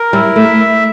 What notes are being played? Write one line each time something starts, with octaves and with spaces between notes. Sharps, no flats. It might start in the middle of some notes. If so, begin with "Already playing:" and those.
Already playing: A#4
G3 E4
A3 E5